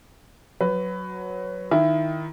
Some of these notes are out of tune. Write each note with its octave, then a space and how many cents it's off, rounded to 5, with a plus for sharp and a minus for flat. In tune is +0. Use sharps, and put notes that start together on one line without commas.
F#3 +0 B4 +15
D#3 +0 E4 +15